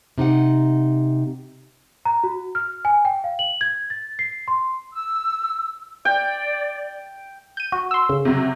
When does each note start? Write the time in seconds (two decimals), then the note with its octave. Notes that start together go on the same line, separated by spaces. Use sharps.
0.18 C3 D#4 G4 F#5
2.05 A#5
2.24 F#4
2.55 F6
2.85 G#5
3.05 G5
3.24 F5
3.39 F#7
3.61 G#6
3.90 A6
4.19 C7
4.48 C6
4.93 E6
6.05 D5 G5
7.57 G6 D#7
7.72 F#4
7.91 C6 E6
8.09 C#3
8.25 C3 F#3